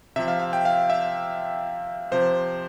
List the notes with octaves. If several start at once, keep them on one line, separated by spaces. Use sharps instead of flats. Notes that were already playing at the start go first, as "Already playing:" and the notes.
C3 F3 E5
F5
F5
G5
F5
E5
C3 F3 C5